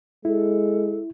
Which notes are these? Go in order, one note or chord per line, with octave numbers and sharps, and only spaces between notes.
G#3 E4 A4